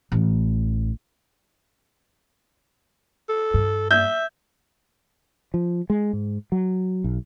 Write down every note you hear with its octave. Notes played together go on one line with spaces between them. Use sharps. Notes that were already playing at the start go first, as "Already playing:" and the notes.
A1
A4
G2
E5 G6
F3
G#3
G#2
F#3
B1